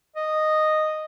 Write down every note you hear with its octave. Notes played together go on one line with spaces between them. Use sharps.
D#5